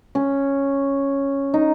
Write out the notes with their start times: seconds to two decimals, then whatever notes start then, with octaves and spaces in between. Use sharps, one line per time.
0.15 C#4
1.54 D#4